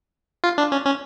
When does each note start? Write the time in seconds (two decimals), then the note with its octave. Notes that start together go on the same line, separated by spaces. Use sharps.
0.44 F4
0.58 D4
0.72 C#4
0.86 C#4